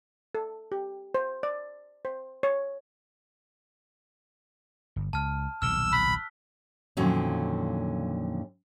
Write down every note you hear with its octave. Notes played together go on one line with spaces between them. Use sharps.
A4
G4
C5
D5
C5
C#5
G1
C#2 A5 F6
D#1 B1 C3 E6 F6 G7
B5 E6 F#6 B6
F2 A#2 D3 D#3 F#3 C#4